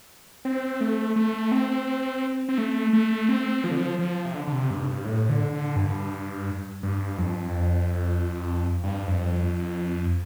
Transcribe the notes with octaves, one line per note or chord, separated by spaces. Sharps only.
C4
A3
A3
C4
C4
A3
A3
C4
F3
D3
F3
F3
C3
D3
D3
C3
G2
A2
G2
A2
D3
D3
G2
G2
F2
G2
F2